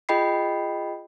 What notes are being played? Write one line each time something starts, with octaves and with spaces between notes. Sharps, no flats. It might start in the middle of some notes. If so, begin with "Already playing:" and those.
F4 G#4 D#5 G5 B5 C7